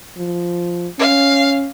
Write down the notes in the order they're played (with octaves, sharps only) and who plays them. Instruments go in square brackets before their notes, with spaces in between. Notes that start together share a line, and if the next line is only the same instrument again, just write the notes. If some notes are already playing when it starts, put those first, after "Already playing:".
[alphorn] F3
[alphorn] C#4 [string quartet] F5